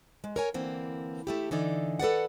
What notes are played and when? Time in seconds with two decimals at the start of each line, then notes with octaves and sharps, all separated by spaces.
0.24 G#3
0.36 A#4 C#5 G#5
0.54 D3 E3 A#3 C4
1.27 A3 E4 G4
1.51 D3 E3 D#4 D5
1.99 A4 B4 D5 F#5